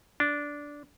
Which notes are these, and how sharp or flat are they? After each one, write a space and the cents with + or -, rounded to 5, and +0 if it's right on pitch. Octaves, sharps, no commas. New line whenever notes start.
D4 -10